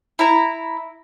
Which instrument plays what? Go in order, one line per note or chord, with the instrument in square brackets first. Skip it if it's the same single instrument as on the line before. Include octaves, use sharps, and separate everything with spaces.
[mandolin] E4 A#5